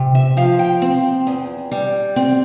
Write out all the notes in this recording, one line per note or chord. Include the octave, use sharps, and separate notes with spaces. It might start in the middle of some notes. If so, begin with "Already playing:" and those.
Already playing: C3
E5
F3 F5
G5
C4
E2
G3
C4